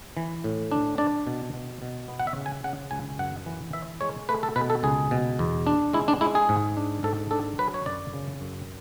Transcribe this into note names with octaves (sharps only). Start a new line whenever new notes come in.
E3
A2
D4
D4 D5
B2
B2
B2
B3
F#5
E5
C#3
G#5
C#3 F#5
C#2 G#5
F#2 F#5
E3
E3 E5
G#3 C#5
A3 B4
A4
B2 B4
A4
C#2 G#4
B2
E2
D4
G#3 E4
D4
G#3 E4
G#4
G#2
D4
G#2 A4
D4 A4
F#3 B4
C#5
F#2 D5
C#3
F#2